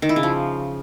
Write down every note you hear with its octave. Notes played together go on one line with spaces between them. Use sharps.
D#3
E4
C#3
F3